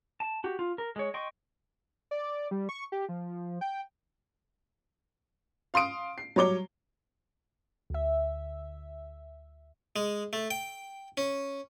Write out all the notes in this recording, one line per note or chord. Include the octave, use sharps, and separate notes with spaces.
A5
F#4 G4
F4
A#4
G#3 C#5
D#5 G5 C6 C#6
D5
G3
C#6
G4
F3
G5
F5 C6 D#6 D7
C7
F#3 G3 C#5 D6 G7
D2 E5
G#3
A3
G5
C#4